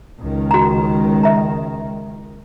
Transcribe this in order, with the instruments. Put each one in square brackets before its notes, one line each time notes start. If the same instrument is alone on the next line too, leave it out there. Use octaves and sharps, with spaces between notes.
[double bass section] C#2 D#3
[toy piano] F#4 A#5
E5 A#5